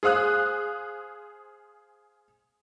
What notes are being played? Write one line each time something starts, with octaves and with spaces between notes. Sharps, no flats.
G#4 C5 F5 D#6 F#6